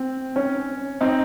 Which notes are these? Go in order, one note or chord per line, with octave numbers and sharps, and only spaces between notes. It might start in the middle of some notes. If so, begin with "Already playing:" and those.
Already playing: C4
C#4
C4 D#4